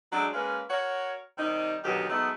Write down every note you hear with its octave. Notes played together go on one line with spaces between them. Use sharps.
F#3 G#3 A3 D4
G#3 A#3 C#4 B4 F5
F#4 A#4 C#5
C3 D#3 G3 D#4
D2 B2 D#3 F#3 G4
F#3 G#3 A3 B3 D#4